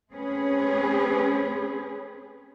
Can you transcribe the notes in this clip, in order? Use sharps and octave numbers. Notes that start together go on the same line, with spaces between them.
A3 C4 C#4 G#4 B4